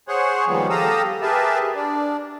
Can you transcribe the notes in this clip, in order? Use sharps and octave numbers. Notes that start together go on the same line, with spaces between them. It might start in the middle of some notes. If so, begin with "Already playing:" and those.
G#4 C5 C#5 F#5
D#2 F3 G3 G#3 B3
G4 A4 F5 A#5 D#6 E6
G4 G#4 A#4 B4 E5 A5
D4